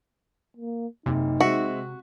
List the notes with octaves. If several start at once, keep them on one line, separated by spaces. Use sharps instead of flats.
A#3
F#1 C3 D#4
G#3 C4 F#4 E5